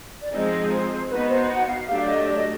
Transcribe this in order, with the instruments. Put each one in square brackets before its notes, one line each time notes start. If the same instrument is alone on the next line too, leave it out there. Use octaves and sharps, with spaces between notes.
[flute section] D5
[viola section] F3 G#3 C4 D#4 G#4 [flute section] D#5
[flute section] C5
[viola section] B3 D#4 F#4 [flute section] B4
[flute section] C5
F#5
F5
E5
[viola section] F#3 A3 D4 G4 [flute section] F5
[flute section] D5
D#5
D5
D#5